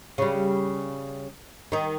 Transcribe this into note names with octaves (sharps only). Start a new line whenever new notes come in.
C#3 G3
D#3 D#4